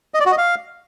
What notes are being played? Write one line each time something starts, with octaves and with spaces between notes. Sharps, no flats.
D#5
D5
F#4
D#5
F5